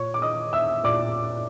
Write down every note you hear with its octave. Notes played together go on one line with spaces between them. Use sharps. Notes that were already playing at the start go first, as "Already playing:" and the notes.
Already playing: A#2 C#5 C#6
D6
D#5 D#6
E5 E6
A#2 D5 D6